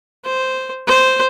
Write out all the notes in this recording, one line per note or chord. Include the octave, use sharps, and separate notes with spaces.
C5
C5